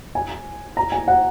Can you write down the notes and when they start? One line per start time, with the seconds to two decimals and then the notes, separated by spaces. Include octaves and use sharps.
0.15 G#5
0.77 A#5
0.92 G#5
1.08 F#5